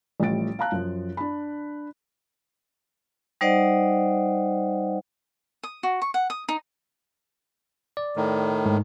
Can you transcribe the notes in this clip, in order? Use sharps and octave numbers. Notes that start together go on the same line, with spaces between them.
A1 F3 G3 A3 A6 D7
F5 A5 A#5 F#6
F#2 F3
D4 B5
G3 D#4 C5 D5 D#5 F#5
D#6
F#4
C#6
F#5
D#6
D#4
D5
A2 D#3
G#2